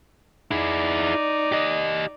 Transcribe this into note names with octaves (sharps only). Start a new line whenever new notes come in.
D#4 E4 G#4 D5
G4 D#5